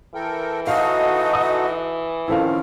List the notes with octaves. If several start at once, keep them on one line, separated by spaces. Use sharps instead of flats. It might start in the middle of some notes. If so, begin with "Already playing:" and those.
E3 A4 A#4 G5
D#4 F#4 A4 D#5 F5
D#6
D#3 F3 C4 C#4 E4 A4 F5